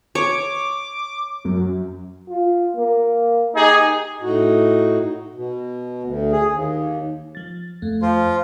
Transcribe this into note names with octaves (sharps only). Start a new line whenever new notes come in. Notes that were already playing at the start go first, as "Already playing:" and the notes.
C#5 D6
F#2
F4
A#3
D#4 G4 G#4
A2 D#4 F#4
B2
D2
G#4
D#2
F3 A6
F2 A3
F3 F4